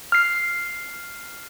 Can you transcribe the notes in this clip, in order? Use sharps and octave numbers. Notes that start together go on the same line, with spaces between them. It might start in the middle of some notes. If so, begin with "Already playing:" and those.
F6 C7